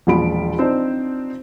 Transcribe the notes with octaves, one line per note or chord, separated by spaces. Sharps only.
E1 A#1 F3 F4 B5 D7
C4 D4 D#4 F4 C5